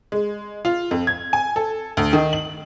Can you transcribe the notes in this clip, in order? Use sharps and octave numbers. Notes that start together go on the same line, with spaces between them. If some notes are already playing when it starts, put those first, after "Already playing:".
G#3
F4
F2
G#6
G#5
A4
D2
D#3
F#7